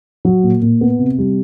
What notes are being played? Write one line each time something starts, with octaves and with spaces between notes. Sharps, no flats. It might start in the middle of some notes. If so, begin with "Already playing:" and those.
F#3
A#2
A#2
B3
C3
G3